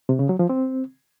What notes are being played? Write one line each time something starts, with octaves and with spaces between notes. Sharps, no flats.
C3
C#3
F#3
F3
C4